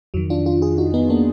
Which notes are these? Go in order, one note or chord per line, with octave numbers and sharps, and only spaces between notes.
F2 D#3 F#3
D4 F4
D4 F4
F4 G#4
D#4 F#4
B3 D#4
A#3 D4